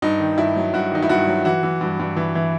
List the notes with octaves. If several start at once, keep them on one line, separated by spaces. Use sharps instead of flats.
G2 D#4
D#3
G2 E4
F#3
G2 F#4
D#3 D#4
E4
G2 F#4
F#3
E3 F#4
E3
G2
G2
E3
E3